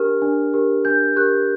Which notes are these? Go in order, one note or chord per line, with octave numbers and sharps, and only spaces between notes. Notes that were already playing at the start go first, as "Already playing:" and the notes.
Already playing: D4 G4 A#4 F6
D4
G4 A#4
D4 G6
G4 A#4 F#6